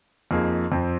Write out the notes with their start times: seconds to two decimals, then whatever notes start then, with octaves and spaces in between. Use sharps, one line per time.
0.31 F2 F3 A#3 D#4 G#4
0.72 F2 F3 C4